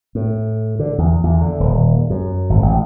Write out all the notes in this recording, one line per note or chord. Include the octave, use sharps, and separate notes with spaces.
A2
D3
E2
E2
D3
D#1
F#2
G#1
A1